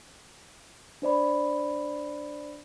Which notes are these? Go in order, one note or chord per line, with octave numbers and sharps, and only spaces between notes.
D4 C5 D5 B5